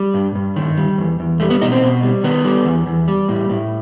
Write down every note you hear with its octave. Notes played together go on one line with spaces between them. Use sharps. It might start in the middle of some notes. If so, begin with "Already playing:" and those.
Already playing: G3
G2
G2
D#3
G3
E2
E2
G3 A3
B3
B2 D#4
C4
B2
G3
D#3 B3
G3
E2
E2
G3
A2
A2